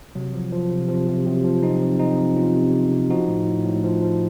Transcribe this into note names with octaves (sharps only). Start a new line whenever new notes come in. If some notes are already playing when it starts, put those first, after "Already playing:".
C3 F#3
F3
F3
C3
C3 F3
C3
C3 F#3
F3
C3 C4 D#4
F3
C3 C4 D#4
F3
C3 C#4 F4
C3
C3
C3
F3 D#4 F#4
A2
A2
A2
F3
F3